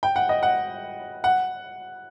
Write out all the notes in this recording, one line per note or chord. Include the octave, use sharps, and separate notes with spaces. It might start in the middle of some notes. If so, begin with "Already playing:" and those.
G5
F#5
D#5
F#5
F#5